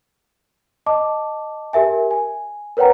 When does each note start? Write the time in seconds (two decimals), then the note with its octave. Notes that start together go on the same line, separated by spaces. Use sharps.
0.86 D#5 A5 D6
1.73 G4 A#4 E5 G#5
2.11 G#5
2.77 A#4 B4 C#5 F#5 G5 A#5